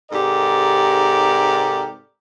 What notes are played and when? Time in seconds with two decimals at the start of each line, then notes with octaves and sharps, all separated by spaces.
0.11 G#2 C3 G4 A4 A#4 D5